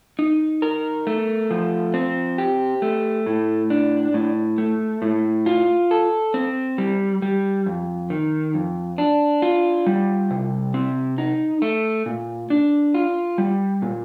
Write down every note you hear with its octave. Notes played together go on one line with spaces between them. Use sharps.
D#4
A#4
A3
F3
C4
G4
A3
A2
D4
A2
A3
A2
F4
A4
C4
G3
G3
F2
D#3
F2
D4
F4
G3
C3
C4
D#4
A3
A#2
D4
F4
G3
A#2